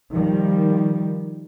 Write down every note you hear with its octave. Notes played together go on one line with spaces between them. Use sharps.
D#3 F3 G3